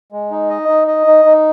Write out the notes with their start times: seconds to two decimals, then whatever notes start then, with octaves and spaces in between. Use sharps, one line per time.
0.12 G#3
0.31 D#4
0.50 D#5
0.69 D#4
0.88 D#5
1.07 D#4
1.25 D#4